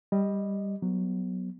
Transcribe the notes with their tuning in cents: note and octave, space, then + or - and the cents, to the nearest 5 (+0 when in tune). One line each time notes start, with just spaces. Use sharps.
G3 +10 D#5 +0
F#3 +0 B3 +0